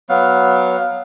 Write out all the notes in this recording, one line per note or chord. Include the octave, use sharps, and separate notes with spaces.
F#3 B3 F5